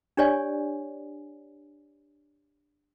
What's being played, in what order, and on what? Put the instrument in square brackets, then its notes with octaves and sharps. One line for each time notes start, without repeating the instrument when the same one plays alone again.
[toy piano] D4 G4 C#5 D5 G#5